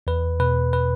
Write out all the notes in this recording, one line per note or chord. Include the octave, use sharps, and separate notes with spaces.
E2 B4
B2 B4
B4